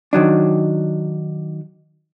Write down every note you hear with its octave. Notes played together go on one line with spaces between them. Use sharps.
D#3 F#3 D4